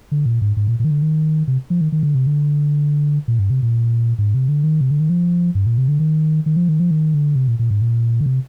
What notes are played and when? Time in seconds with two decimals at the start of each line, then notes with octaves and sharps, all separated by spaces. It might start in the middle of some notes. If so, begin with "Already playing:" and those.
0.12 D3
0.26 A#2
0.42 G#2
0.57 G#2
0.67 A#2
0.80 A#2
0.85 D#3
0.91 D3
1.02 D#3
1.48 C3
1.70 F3
1.81 D#3
1.92 D#3
2.03 D3
2.15 C3
2.27 D3
3.28 A#2
3.39 G2
3.50 C3
3.62 A#2
4.18 G#2
4.34 C3
4.48 D3
4.64 D#3
4.81 C3
4.91 D3
5.00 D#3
5.10 F3
5.55 G2
5.66 A#2
5.78 C3
5.88 D3
6.00 D#3
6.46 D#3
6.56 F3
6.69 D#3
6.80 F3
6.91 D#3
7.14 D3
7.35 C3
7.48 A#2
7.59 A#2
7.71 G#2
7.81 A#2
8.21 D3
8.26 C3